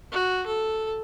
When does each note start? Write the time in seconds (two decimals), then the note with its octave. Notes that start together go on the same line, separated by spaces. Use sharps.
0.12 F#4
0.47 A4